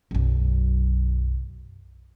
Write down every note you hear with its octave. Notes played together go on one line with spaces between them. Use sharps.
B1 F#2